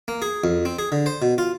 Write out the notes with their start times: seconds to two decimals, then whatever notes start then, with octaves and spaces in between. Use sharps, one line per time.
0.08 A#3
0.22 G#4
0.44 F2
0.65 C4
0.79 G#4
0.92 D3
1.06 C5
1.22 B2
1.38 F4